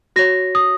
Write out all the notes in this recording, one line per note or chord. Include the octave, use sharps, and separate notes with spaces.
F#4 C#5 A#6
D#6